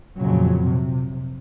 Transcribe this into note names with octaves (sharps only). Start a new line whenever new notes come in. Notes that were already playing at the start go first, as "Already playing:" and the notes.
F2 A#2 C#3 F#3
C3